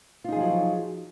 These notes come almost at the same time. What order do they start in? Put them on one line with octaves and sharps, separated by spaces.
F4 D#4 G#4 F3 F#3